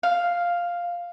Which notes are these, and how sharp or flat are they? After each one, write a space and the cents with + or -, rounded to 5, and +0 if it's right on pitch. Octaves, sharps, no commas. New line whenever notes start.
F5 +0